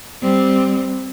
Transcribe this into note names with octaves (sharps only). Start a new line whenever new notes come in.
G3 C4